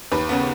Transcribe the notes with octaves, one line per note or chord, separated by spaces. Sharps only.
D#2 B4
C#3 B3